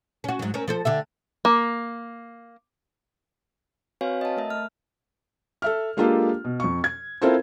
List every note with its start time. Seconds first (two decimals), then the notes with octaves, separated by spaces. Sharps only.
0.24 C#4 F#4
0.39 G#2 F#3
0.54 C4 C#4 A#4
0.68 F3 A4 C5
0.85 D3 G4 E5
1.45 A#3
4.01 C4 F#4 B4 C#5 F5 G#5
4.21 D#5 A5
4.37 A3 A#4 E5
4.50 A3 E5 F6
5.62 A4 E5 F6
5.97 G#3 A#3 D4 F4 G4 A4
6.44 B2
6.60 F2 C#6
6.84 G#6
7.22 C4 E4 F4 A4 A#4 C5